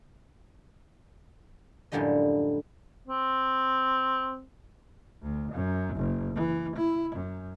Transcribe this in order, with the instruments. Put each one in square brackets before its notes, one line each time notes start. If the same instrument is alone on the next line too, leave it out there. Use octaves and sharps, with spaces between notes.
[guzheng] F#2 A2 D3 F3 G3 D#5
[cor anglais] C4
[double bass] D2
F#2
F#1
E3
E4
F#2